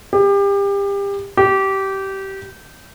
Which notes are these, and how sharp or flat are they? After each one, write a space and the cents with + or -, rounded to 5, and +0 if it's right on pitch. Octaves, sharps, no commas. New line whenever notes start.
G4 +30
G4 -20